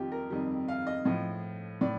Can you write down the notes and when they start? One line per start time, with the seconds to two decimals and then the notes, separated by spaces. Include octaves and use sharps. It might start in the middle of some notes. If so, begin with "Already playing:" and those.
Already playing: F2 D#3 G3 F4 G4
0.12 A#4
0.30 F2 D#3 G3
0.68 F5
0.87 D#5
1.05 A2 F3 D#5
1.81 A2 D5